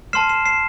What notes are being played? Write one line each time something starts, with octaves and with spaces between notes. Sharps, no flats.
A5 C6 F6 C7 E7
C7 E7
C7 E7